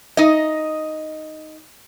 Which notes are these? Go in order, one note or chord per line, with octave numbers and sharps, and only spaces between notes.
D#4 D#5